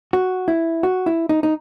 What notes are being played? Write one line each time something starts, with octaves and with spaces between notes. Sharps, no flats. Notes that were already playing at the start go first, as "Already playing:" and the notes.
F#4
E4
F#4
E4
D#4
D#4